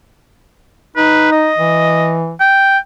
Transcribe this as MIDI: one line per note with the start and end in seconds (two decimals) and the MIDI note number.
0.96 1.51 63
0.96 1.31 71
1.33 2.15 75
1.58 2.34 52
2.40 2.78 79